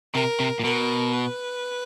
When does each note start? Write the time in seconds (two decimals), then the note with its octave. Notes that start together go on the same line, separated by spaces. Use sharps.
0.14 C3 A#4
0.40 C3
0.60 A#2
0.64 B2 A#4
1.14 B4